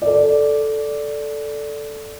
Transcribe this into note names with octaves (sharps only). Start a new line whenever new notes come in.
A4 D5